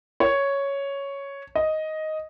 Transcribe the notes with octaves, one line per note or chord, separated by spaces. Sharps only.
C#5
D#5